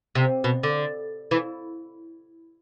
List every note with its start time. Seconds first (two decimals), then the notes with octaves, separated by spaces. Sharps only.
0.15 C3
0.44 B2
0.63 D3
1.31 E3